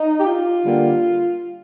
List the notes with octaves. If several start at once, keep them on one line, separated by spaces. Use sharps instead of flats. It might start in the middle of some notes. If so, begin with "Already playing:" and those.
Already playing: D#4
G4
F4
D3 G3 A#3